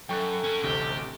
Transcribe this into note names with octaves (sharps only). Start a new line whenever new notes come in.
F#2 A4 G5 C#6 F#6
C#4 F#4
A1 D2 C3 G4